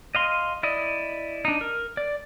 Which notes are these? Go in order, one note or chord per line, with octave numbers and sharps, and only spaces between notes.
D#5 F5 C6
E4 D5 D#5
D4 D#4
A#4
D5